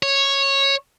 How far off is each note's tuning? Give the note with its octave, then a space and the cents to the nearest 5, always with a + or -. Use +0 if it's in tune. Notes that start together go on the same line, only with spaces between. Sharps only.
C#5 -10